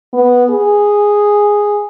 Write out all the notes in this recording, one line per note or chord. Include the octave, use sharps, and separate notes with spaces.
B3
G#4